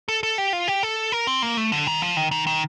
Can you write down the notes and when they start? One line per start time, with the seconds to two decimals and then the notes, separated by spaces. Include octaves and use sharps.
0.09 A4
0.23 A4
0.38 G4
0.53 F4
0.68 G4
0.83 A4
1.12 A#4
1.27 C4
1.42 A#3
1.57 A3
1.72 D3
1.87 D#3
2.02 F3
2.17 D#3
2.31 D#3
2.47 D#3